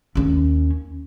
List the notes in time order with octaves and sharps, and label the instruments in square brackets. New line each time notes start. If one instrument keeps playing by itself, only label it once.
[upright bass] D#2 C#4